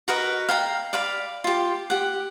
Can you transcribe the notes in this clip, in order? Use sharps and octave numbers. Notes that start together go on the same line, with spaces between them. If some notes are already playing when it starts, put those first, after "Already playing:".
F#4 A#4 B4 D#5
F5 G5 A#5
D5 F5 B5
F4 G4
G4 F#5